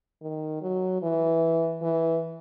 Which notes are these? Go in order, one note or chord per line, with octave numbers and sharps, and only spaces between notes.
D#3
F#3
E3
E3